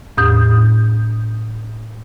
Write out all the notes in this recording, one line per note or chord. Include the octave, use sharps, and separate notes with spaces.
E2 A2 D#6 G6